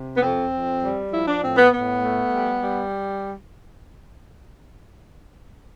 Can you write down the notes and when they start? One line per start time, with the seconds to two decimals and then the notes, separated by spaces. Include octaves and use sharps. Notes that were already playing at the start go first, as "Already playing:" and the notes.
Already playing: C3
0.15 B3
0.21 F2 C4
0.52 F2
0.82 G3
1.12 F3 E4
1.27 D4
1.42 A2 C4
1.57 B3
1.73 A2 B3
2.02 A3
2.33 G3
2.63 G3